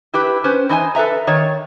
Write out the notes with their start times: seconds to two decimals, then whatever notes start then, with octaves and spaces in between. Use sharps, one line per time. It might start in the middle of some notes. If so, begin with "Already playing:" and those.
0.14 E4 G4 B4
0.44 C#4 B4 C5
0.69 E3 D#4 C5 G#5
0.95 A4 B4 E5 A#5
1.27 D#3 C#5